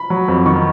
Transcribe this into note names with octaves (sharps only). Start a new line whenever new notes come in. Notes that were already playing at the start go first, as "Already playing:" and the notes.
Already playing: B5
F#3
F2
D#3 C#6